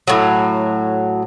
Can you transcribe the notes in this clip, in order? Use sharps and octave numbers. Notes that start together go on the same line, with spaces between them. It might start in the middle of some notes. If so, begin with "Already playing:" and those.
A2 F#3